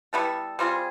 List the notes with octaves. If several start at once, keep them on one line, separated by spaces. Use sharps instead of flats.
G3 B3 E4 A4
G3 C4 F4 G#4